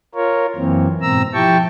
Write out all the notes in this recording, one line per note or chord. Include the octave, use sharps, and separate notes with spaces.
F4 A#4 C#5
F#2 E3 A#3 C4
G#2 B2 C4 A#5 E6
F3 E4 G4 G5 A5 C#6